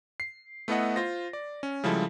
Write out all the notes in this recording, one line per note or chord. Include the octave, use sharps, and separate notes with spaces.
C7
A3 B3 E4 A4 D#5 F#5
F4 C5 A#6
D5
C#4
C#3 F3 G3 G#3 E4 A4